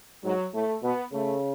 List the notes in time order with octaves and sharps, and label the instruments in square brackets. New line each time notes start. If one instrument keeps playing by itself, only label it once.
[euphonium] G#2 [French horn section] F#3
[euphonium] A2 [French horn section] A3
[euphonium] B2 [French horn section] B3
[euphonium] C#3 [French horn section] A3